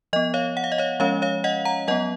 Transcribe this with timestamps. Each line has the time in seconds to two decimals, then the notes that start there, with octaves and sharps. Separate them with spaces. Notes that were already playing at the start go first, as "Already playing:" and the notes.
0.13 F3 D#5
0.16 B3
0.34 C#5 F5
0.57 F#5
0.64 F5
0.72 D#5
0.78 C#5 F5
1.00 F3 G#3 C#4 C#5 F5
1.22 C#5 F5
1.44 D#5 F#5
1.65 F#5 A#5
1.88 F#3 D#5 F#5
1.91 B3